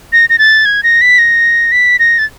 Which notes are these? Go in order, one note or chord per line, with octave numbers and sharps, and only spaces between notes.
A#6
A#6
A6
G#6
A#6
B6
A#6
B6
A#6
A6